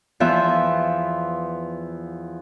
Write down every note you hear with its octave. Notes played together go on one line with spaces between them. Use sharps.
E2 F3 B3 E5